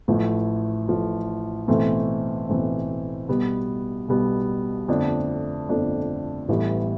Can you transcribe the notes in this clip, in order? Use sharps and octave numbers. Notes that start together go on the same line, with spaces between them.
A1 A2 F3
A1 A2 F3
B1 A2 E3 A3 C4
B1 A2 E3 A3 C4
B1 B2 G3 B3
B1 B2 G3 B3
G1 F2 D3 A3 D4
G1 F2 D3 A3 D4
A1 A2 E3 G3 B3